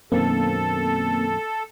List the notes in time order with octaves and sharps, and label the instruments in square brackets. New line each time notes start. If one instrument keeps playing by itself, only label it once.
[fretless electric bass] F#2 B2 D#3 [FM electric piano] A#3 C4 [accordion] A4